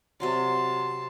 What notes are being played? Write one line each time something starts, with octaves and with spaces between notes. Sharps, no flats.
C3 F#3 D5 A5 C6